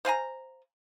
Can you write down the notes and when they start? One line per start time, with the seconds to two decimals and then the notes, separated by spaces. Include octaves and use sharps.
0.05 C5 F5 G#5 A#5